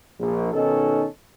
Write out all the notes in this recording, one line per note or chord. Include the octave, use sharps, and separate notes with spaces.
A#1
B2 D#3 C#4 D#4 A4